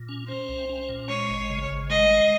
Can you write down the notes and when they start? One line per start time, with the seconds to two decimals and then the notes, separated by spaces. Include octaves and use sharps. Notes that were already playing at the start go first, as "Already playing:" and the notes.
Already playing: A#2
0.09 C#4
0.28 C#4 C5
0.49 C2
0.69 C#4
0.89 A#2
1.09 G#3 C#5
1.29 G#1
1.50 C#3
1.70 G#1
1.90 G#3 D#5
2.10 G#3